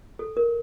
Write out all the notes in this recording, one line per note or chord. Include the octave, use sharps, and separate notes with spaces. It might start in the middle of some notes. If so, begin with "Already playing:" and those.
A4
A#4